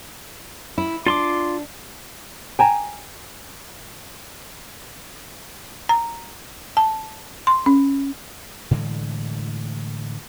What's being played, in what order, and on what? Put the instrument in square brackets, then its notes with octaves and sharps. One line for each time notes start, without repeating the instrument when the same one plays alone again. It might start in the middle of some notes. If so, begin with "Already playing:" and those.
[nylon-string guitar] E4
[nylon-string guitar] D4 [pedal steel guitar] F4 C6 D6
[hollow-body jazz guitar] G5 G#5 A#5
[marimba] A#5
A5
C6
C#4
[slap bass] A2 D3 E3 G#3